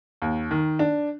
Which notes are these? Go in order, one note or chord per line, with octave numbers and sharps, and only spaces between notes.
D#2
D#3
D4